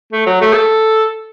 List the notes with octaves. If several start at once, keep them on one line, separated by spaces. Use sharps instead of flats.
A3
F#3
A3
A4